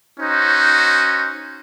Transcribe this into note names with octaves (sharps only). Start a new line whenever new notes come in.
C#4 D#4 F#4 C5